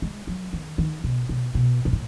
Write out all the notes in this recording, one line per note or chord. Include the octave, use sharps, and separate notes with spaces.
G#3
F#3
D#3
D#3
B2
B2
B2
B2
A2